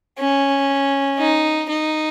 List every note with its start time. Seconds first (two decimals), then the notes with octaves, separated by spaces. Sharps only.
0.19 C#4
1.19 D#4
1.69 D#4